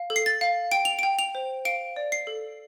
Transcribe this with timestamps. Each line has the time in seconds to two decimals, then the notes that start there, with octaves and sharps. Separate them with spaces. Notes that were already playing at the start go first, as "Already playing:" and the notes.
Already playing: F5
0.10 A4
0.16 C7
0.26 A6
0.41 F5
0.71 G5 D7
0.85 F7
0.99 G5 D7
1.19 F7
1.35 C5
1.65 F5 D7
1.96 D5
2.12 C7
2.27 A4